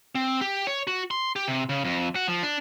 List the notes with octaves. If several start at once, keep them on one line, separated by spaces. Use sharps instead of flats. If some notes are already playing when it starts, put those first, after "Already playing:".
C4
G4
C#5
F#4
C6
G4
C3
C#3
F2
F#4
F3
D4